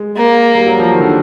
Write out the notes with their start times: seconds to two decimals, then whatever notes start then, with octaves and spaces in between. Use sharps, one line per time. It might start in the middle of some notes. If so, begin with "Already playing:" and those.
Already playing: G#3
0.16 A#3
0.55 G3
0.67 F#3
0.79 F3
0.93 D#3
1.01 D3